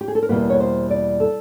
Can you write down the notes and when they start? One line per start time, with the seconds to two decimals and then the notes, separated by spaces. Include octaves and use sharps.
0.01 G4
0.08 G#4
0.15 A4
0.23 A#4
0.29 E2 B2 G3 A#3 B4
0.50 C#5
0.60 C5
0.90 D5
1.20 A4